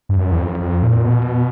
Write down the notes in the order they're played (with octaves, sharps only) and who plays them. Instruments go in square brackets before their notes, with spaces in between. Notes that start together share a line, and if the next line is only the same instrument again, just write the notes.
[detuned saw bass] G2
F#2
E2
F2
F2
A#2
B2